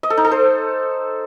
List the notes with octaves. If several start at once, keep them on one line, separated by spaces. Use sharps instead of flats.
D#5
A4
D#4
A4
C5